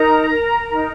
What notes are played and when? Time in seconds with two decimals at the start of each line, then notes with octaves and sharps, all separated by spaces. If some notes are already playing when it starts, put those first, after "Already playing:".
Already playing: D#4 A#4 A#5
0.30 A#4
0.70 D#4